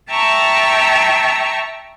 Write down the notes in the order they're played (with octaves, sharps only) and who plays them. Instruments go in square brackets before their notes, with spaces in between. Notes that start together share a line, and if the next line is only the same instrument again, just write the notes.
[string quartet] E5 G5 A5 A#5 C#6 E6